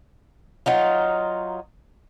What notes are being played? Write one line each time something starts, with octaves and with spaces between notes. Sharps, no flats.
F#3 D#4 F4